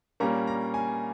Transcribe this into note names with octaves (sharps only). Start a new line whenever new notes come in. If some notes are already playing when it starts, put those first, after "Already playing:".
A#2 G3 A#3 C#4 A#5
A#5
G#5